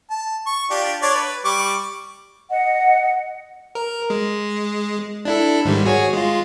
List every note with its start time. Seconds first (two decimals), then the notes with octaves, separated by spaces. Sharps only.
0.10 A5
0.46 C#6
0.70 D4 F4 G4
1.02 D4 C#5 D5
1.14 B4
1.45 G3 C#6 D6
2.50 D#5 F#5
3.75 A#4
4.10 G#3
5.25 D4 E4 A4
5.65 G#2 D#3 G3
5.85 F#4 G#4 C#5
6.13 G#3 F4